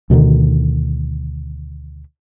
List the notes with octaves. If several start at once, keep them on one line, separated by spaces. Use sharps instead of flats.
D2 B2 D3 D#3